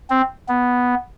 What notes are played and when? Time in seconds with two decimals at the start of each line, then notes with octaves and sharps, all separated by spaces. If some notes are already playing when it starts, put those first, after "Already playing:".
0.10 C4
0.48 B3